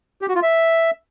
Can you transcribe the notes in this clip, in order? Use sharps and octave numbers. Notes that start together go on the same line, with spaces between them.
G4
F#4
F4
E5